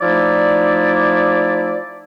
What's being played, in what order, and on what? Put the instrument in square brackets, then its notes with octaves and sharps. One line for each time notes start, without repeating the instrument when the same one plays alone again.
[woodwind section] F3 A3 D#4 E4 D5